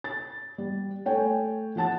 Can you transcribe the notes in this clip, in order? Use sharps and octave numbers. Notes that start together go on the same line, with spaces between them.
A6
G3
A3 C#5 G5 G#5
F3 F#5 A5 A6